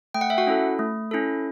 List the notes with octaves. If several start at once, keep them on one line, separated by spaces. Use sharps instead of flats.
A3 G5
F#5
E5
F#4 F#5
C#4 E4 A4
A3
C#4 E4 A4